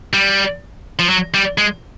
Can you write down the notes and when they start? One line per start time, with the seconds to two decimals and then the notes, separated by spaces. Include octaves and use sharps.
0.13 G3
0.99 F3
1.09 F#3
1.34 G3
1.58 G#3